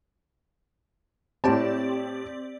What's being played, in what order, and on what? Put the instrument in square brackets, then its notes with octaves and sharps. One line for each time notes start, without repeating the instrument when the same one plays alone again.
[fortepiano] A2 A5 [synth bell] C4 G4 D5